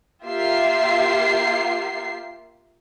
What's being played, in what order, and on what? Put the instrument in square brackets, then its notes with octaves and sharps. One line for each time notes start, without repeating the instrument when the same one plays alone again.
[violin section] A#3 F4 G4 E5 C7